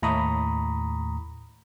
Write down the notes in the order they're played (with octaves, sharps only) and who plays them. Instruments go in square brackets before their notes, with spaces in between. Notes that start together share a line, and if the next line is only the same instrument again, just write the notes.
[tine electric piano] D#2 A2 A#5 B5 C#6 D#6